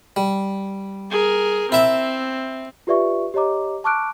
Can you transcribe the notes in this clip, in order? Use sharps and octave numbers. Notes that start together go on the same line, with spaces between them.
G3
G#4 A#4
C4 E4 E5 A5
F4 G4 B4 D5 E5 C#6
G4 C#5 D#5 A#5 D6
A5 C#6 D6 F6 F#6 D7